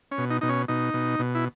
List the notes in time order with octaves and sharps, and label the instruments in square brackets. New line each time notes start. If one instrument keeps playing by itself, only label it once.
[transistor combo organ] C#4
B2
D#4
B2 D#4
C#4
B2 D#4
B2
B2
E4